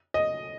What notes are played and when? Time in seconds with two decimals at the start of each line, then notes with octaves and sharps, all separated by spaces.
0.14 D#5